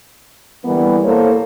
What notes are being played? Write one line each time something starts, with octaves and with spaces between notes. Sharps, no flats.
D3 E3 G3 A#3 B3
A2 A#3 A4 C5 C#5